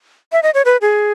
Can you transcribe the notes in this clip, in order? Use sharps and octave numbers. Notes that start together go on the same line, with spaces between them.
E5
D#5
C#5
B4
G#4